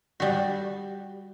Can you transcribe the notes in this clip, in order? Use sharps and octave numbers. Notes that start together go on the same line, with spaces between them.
G3 F#4